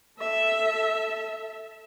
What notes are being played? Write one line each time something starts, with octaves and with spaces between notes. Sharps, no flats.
A4 E5